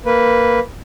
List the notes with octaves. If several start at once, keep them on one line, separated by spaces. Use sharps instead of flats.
A#3 B4